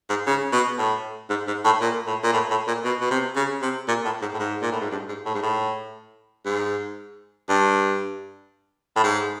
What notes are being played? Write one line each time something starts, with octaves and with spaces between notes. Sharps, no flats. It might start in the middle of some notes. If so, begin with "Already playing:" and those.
G#2
C#3
B2
A2
G#2
G#2
A2
A#2
A2
A#2
A2
A2
A#2
B2
B2
C3
C#3
C3
A#2
A2
G#2
A2
G#2
A#2
A2
G#2
G2
G#2
A2
G#2
A2
G#2
G2
A2
G#2